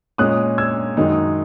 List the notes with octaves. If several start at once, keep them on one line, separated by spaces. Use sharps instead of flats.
A#2 G#3 C#4 D#6 F#6
E6 G#6
F#2 D#3 G#3 D#4